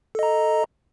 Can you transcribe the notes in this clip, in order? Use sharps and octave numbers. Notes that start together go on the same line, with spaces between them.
A4 D#5 A#5